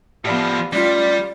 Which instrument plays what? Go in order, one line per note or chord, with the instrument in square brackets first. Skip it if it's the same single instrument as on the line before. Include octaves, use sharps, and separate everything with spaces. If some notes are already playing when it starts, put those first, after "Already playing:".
[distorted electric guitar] A2 F3 [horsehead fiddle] B3 F5 [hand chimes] G4 D5 B5
[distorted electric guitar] G3 [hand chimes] A3 C#4 [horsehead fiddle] F4 [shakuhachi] D5